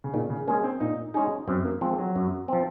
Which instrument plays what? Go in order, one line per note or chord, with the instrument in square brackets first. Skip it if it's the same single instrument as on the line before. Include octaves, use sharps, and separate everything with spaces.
[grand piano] C#3
[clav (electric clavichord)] A#2 [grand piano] D#3
[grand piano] C#3
[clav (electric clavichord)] G#3 C#4 G#4 [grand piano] A#3
[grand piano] C4
[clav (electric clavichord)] A#2 [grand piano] D#4
[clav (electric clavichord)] G#3 C#4 G#4 [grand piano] D#4
[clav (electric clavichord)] F#2 [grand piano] C4
[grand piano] A#3
[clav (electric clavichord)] F3 C4 [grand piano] G#3
[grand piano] F#3
[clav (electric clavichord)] F#2
F3 C4